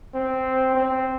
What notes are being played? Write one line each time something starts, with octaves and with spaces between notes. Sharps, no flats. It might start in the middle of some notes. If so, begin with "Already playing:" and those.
C4
C4